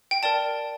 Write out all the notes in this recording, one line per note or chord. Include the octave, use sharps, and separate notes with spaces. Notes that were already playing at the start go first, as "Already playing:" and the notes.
G5
A#4 D5 G5 A5